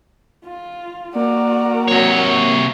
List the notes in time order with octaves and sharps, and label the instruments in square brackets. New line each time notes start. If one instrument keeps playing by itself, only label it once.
[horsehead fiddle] F4
[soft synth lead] A#3 [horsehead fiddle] F#4 A#4 [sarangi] D5
[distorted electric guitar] C3 C#5 [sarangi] F#3